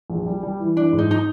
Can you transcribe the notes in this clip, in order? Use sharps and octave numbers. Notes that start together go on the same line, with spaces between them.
A#1
G3
G3
E3
E3 D4
G#2
D#4
D#4